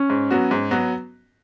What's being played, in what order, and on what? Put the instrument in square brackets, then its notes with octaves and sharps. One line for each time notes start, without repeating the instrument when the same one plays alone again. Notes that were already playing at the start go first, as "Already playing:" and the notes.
Already playing: [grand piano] C#4
[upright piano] G#2
F#3 B3 F#4
G#2
F#3 B3 F#4